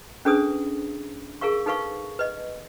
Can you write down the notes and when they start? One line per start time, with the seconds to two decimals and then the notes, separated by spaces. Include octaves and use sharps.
0.25 C#4 D4 G#4 A4 B4 D#6
1.41 G#4 A#4 F5 C#6
1.66 D#4 A4 B4 F5 C#6
2.19 B4 D#5